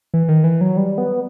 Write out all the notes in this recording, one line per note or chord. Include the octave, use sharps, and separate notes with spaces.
E3
D#3
E3
F#3
G3
B3